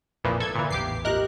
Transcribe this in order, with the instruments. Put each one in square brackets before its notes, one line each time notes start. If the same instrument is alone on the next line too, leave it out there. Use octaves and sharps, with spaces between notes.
[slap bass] A#1 F2 [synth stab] A#2 E3 F3
[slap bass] G#2 [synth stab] A4 G#6
[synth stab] A#2 E3 [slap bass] D3
[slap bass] A1 E2 G#2 [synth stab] G4 D6 C7
[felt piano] G4 D#5 [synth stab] A#4 F#6